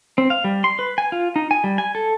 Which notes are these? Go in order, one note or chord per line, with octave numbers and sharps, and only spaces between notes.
C4
F5
G3
C6
B4
G#5
F4
D#4
G#5
G3
G#5
A4